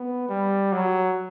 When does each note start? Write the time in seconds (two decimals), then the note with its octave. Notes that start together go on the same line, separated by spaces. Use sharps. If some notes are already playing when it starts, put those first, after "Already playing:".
Already playing: B3
0.29 G3
0.72 F#3